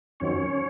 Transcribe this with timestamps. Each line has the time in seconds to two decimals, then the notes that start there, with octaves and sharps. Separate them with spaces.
0.20 F2 D#3 F#3 C4 C#4 C#5